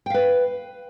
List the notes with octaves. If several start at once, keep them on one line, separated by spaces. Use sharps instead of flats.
B4 F5 G5